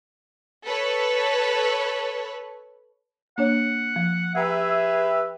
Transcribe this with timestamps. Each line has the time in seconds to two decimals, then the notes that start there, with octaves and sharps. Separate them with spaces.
0.66 A4 B4 C#5
3.38 A#3 D4 C#5 F#5
3.96 F3
4.35 G4 G#4 B4 E5 F#5 G#5 A#5